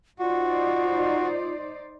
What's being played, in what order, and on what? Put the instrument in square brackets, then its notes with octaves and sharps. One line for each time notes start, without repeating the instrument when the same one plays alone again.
[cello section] D#4 C5 D5 [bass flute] F4 [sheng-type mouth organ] F#4